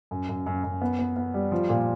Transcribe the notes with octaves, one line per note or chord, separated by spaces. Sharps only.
F#2
F#2
F#2
F#2
B3
B3
B3
G3
F3
A#2